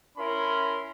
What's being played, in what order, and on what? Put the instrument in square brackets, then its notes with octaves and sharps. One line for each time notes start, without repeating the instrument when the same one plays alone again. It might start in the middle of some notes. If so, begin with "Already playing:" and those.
[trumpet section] C#4 E4 A#4 B5 C6